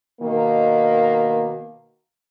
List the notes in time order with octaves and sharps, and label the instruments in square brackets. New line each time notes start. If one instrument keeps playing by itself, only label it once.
[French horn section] B2 D#3 A#3